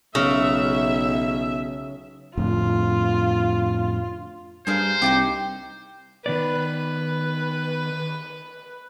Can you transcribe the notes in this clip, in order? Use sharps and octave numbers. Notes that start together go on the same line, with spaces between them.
B1 C#3 E5
F2 A2 D3 F4
G2 G#4 A#4 C5 F5
C2 D#4 F4 G4
D#3 B3 B4 D5